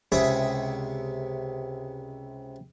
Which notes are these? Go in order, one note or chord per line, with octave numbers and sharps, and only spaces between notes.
C#2 C3 G#4 E5 B5 D#6